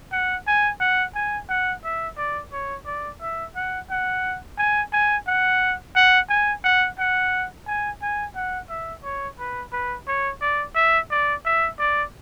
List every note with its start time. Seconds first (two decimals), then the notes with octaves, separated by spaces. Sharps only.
0.12 F#5
0.47 G#5
0.81 F#5
1.15 G#5
1.49 F#5
1.84 E5
2.18 D5
2.52 C#5
2.86 D5
3.21 E5
3.56 F#5
3.90 F#5
4.58 G#5
4.93 G#5
5.27 F#5
5.96 F#5
6.29 G#5
6.64 F#5
6.99 F#5
7.67 G#5
8.02 G#5
8.36 F#5
8.70 E5
9.04 C#5
9.39 B4
9.73 B4
10.08 C#5
10.41 D5
10.75 E5
11.11 D5
11.45 E5
11.79 D5